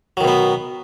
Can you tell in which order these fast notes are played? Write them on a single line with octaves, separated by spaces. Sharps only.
F#3 D#3 B2 B3